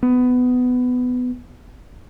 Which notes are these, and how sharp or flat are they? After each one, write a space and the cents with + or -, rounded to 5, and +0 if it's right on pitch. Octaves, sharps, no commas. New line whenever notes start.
B3 +15